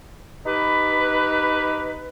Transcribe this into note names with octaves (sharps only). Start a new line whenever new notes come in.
D#4 G4 B4